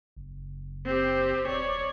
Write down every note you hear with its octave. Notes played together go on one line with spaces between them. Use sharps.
F#1
C4 G4
D#1 C#5 D5